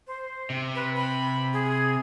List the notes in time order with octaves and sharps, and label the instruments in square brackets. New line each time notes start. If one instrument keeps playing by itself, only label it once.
[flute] C5
[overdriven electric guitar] C3
[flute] B4
B5
G#4